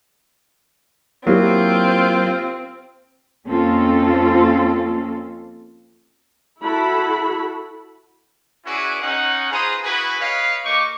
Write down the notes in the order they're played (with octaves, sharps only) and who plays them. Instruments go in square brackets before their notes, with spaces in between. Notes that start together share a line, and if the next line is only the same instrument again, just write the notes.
[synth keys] F#3 [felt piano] A#3 E4 G4 [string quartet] C4 [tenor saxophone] F4
[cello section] F2 A#3 C4 C#4 F4 A4
[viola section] E4 F#4 A4 B5
[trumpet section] C#4 E4 F#4 G#4 B4 D5
C#4 D#4 F#5
F4 G#4 B4 C5 A#5 D#6
E4 F#4 G#4 B4
D#4 B4 C#5 F5
A#3 D#4 G4 C#6 D6